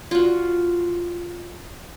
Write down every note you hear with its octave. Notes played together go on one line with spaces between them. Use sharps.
F4 F#4